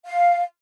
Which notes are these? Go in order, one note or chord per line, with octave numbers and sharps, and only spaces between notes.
F5